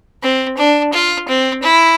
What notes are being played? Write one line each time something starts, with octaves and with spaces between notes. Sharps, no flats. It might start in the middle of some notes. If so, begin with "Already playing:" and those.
C4
D4
F4
C4
E4